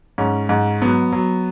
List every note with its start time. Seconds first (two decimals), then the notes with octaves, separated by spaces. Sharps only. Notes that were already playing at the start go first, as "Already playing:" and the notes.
0.18 G#2 C#4
0.49 G#2
0.82 F#3 B3
1.12 F#3